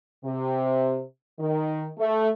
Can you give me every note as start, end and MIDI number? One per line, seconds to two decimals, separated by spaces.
0.24 1.01 48
1.39 1.87 51
1.98 2.29 57